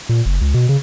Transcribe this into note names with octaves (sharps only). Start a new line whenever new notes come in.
A#2
F#1
C#2
B2
C#3